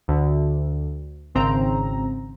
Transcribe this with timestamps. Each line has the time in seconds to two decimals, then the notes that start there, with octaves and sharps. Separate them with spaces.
0.08 D2
1.35 G#1 C#3 C4 A#5